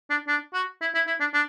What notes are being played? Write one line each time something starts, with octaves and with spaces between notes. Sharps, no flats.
D4
D4
F#4
E4
E4
E4
D4
D4